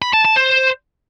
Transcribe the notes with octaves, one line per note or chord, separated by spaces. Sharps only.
B5
A5
A5
C5